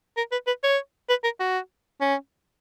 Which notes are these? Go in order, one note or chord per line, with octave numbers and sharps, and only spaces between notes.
A#4
B4
B4
C#5
B4
A#4
F#4
C#4